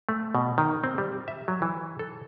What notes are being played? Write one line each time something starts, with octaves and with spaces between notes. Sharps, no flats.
A3
B2
D#3
C4
G3
E5
F#3
E3
A4